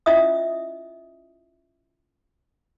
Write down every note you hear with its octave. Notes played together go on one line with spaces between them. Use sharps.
C#4 E4 F4 D#5 E5 D#6